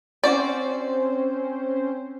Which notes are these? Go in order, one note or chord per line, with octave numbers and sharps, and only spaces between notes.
C4 C#4 F#4 C5 D5